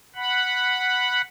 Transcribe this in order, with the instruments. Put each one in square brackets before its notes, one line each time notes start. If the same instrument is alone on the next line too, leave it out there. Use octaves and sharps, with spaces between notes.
[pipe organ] F#5 B5